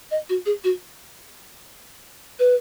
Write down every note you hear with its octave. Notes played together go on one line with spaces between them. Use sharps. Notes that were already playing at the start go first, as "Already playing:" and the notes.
D#5
F#4
G#4
F#4
B4